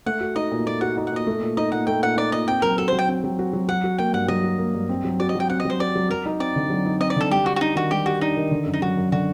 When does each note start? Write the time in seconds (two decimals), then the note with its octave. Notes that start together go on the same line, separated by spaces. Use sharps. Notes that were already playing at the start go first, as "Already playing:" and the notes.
0.06 A3 F#5
0.21 F#4
0.36 D#4 D#5
0.52 A#2
0.66 A3 D5
0.81 F#4 F#5
0.97 D#4
1.07 F#5
1.12 A#2 D#5
1.27 A3
1.42 A#2
1.57 D#4 D#5
1.72 A#2 F#5
1.87 A3 G5
2.03 A#2 F#5
2.17 D#4 D5
2.32 A#2 D#5
2.48 C4 G5
2.62 F#3 A#4
2.78 F#4 A4
2.88 C5
2.93 F#3
2.99 G5
3.08 C4
3.24 F#3
3.39 F#4
3.53 F#3
3.69 F#3 F#5
3.84 F#4
3.98 A#3 G5
4.13 G2 F#5
4.28 F#3 D#5
4.43 F#4
4.59 A#3
4.74 G2
4.89 C4
5.05 F#3
5.20 F#4 D5
5.29 D#5
5.35 F#3 G5
5.50 C4 F#5
5.60 D#5
5.65 F#3 C5
5.80 F#4 D5
5.96 F#3
6.10 F#3 A#4
6.26 D#4
6.40 C4 D5
6.56 D3
6.70 F#3
6.86 D#4
7.00 C4 D#5
7.10 D5
7.16 D3 A4
7.31 G3 G4
7.46 F#4 G4
7.56 F#4
7.60 D4 D#4
7.76 D#3 F#4
7.91 G3 G4
8.06 F#4 G4
8.21 D4 D#4
8.37 D#3
8.51 D3
8.66 F#2
8.73 D#4
8.82 F#3 F#4
8.97 F#2
9.12 D3 F#4